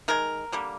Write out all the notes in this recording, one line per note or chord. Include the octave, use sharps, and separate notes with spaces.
D#3 G#3 A#4
D3 G3 A#3